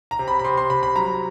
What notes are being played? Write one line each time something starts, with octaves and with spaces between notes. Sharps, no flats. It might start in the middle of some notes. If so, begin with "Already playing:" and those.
A#5
C3
B5
B5
C3 C6
C6
C3 B5
B5
F#3 A#5